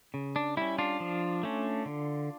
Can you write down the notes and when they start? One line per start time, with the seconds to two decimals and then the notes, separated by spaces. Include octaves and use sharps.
0.14 C#3
0.36 D4
0.57 G3 C#4 E4
0.78 D4 F4
1.00 F3
1.43 A3 C#4
1.86 D3